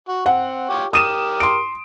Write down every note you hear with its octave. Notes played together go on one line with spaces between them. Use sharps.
F#4
C4 F#5
F4 G4 C#5
G4 A#4 D#6 D#7 E7
C6 D7